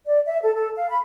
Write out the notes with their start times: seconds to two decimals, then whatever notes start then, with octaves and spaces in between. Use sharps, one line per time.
0.07 D5
0.26 E5
0.43 A4
0.55 A4
0.76 F5
0.90 B5